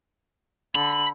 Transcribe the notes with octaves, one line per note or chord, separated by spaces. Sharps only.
D3 B5